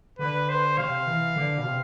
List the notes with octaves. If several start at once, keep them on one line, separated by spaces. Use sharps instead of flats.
D3 B4
C5
C3 F5
E3
D3
B2
C3